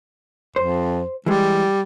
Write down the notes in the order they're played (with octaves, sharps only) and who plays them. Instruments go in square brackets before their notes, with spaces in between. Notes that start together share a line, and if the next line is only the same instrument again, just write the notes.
[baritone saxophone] F2 [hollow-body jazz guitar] C5
[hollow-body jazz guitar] E3 G#3 [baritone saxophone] G3